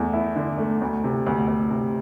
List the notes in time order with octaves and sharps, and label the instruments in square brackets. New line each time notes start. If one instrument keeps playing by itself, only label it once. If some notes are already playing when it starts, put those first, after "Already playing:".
Already playing: [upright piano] E2 A3
E4
D3
A3
D2
C3
D2
D2
C3